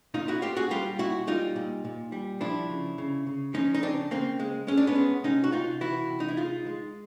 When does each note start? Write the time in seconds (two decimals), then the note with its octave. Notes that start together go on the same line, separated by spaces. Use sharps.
0.14 A#2 D#4 F4
0.28 E4 F#4
0.42 A#2 F4 G4
0.57 F#4 G#4
0.71 G3 F4 G4
0.99 A#2 E4 F#4
1.27 G3 D#4 F4
1.56 A#2
1.85 A#2
2.12 G3
2.41 F3 D4 E4
2.69 C#3
2.98 C#3
3.27 C#3
3.54 F3 C#4 D#4
3.74 D#4
3.82 C#3 C4 D4
4.11 C#3 A#3 C4
4.40 G#3
4.67 G#3 C#4
4.77 D4
4.87 B3 C#4
4.96 G#3
5.24 C3 C#4 D#4
5.44 F#4
5.52 C3 D#4 F4
5.81 E3 E4 F#4
6.09 C3
6.20 D#4
6.28 E4
6.37 G#3 D#4 F4
6.66 G#3